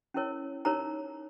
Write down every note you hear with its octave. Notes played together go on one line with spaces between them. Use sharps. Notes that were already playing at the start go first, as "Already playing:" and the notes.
C#4 E4 A#4 C#5
D#4 A#4 C#5 A#5